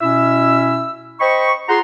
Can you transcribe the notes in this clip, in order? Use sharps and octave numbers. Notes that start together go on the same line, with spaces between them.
B2 C#4 E4 E5 E6
C5 D#5 G5 B5 C#6
F4 G#4 F#5 A#5 C6